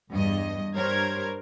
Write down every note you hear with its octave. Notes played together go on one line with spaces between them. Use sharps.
E2 G2 D#5
G2 G3 A#4 C5 C#5 G#6